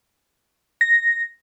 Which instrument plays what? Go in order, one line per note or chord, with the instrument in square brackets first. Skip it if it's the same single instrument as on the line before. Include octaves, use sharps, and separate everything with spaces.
[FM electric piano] A#6